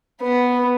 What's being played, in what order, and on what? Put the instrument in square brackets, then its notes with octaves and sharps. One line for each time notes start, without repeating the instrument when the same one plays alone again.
[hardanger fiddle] B3